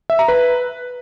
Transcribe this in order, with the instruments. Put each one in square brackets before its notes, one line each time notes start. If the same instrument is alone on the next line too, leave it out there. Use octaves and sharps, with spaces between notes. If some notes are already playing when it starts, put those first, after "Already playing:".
[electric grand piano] E5
A#5
B4